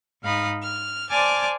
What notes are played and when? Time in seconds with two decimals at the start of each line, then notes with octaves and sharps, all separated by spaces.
0.22 G#2 D#4 F5 B5 D#6
0.62 F6
1.10 C5 D5 G#5 A5 D6 F6